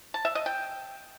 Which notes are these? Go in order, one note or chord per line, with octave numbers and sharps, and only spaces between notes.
A5
E5
D#5
G5